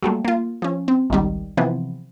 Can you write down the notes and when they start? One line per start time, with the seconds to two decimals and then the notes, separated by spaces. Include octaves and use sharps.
0.03 F#3 G3 A3 A#3
0.25 A#3 F4
0.62 F3 C#4
0.88 C4
1.10 G#1 C#2 D#3 G3
1.57 C3 E3 F3 B3 C4